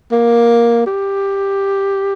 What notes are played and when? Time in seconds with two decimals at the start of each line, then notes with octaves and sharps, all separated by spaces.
0.12 A#3
0.86 G4